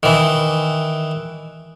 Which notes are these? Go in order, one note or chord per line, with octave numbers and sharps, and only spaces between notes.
D#3 E3